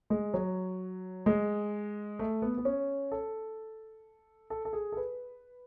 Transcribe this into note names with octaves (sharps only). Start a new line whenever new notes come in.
G#3
F#3
G#3
A3
B3
B3
C#4
A4
A4
A4
G#4
A4
B4